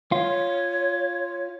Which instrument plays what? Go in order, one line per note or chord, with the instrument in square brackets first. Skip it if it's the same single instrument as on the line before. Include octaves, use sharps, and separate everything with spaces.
[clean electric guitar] F4 [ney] C#5